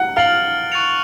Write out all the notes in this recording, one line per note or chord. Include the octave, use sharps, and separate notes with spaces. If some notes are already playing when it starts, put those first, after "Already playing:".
Already playing: F#5
F5 F6 A6 D7 F#7
C#6 F#6 A6 C#7 F7